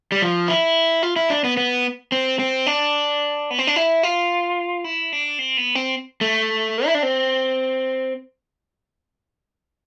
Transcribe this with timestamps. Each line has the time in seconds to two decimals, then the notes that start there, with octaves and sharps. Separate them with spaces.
0.12 G3
0.22 F3
0.48 E4
1.03 F4
1.16 E4
1.30 D4
1.44 B3
1.57 B3
2.12 C4
2.39 C4
2.67 D4
3.51 B3
3.59 C4
3.67 D4
3.76 E4
4.03 F4
4.84 E4
5.13 D4
5.39 C4
5.57 B3
5.75 C4
6.21 A3
6.86 E4
6.95 D4
7.03 C4